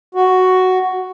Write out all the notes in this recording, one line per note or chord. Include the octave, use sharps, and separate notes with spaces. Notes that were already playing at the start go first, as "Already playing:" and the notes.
F#4